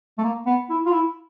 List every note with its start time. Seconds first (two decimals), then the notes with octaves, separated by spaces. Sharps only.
0.18 A3
0.24 A#3
0.46 B3
0.70 E4
0.86 F4
0.92 E4